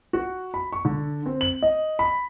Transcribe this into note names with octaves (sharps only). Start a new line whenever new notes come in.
F#4
B5
C#6
D3
C4
F#7
D#5
B5